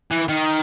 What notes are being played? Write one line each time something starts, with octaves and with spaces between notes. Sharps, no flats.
E3
D#3